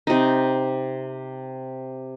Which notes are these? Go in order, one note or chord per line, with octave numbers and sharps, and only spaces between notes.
C3 D#4